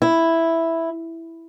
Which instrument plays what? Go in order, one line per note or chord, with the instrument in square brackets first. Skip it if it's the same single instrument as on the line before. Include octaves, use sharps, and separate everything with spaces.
[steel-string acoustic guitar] E4